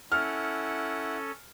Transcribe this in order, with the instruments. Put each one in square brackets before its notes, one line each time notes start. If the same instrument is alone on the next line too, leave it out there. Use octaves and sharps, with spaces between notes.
[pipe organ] C#4 A4 [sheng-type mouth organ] E4 F#5 [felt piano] F6